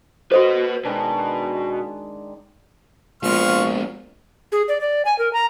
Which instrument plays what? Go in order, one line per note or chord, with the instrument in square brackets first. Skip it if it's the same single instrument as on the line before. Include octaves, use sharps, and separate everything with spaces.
[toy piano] F#4 A4 C5 [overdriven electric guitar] B4 D#5
[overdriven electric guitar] B2 [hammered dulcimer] D#3 G#3 D4
[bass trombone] A#1 [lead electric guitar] G#3 B3 [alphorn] F4 [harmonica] C5 C#6 F6
[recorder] G#4
D5
D5
G#5
A#4
A#5